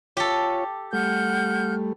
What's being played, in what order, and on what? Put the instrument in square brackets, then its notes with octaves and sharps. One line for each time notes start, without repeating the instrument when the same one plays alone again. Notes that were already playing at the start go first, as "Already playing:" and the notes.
[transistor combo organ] F4 C#5 [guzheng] G4 A4
[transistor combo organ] G3 A3 [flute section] F#5 F6 G6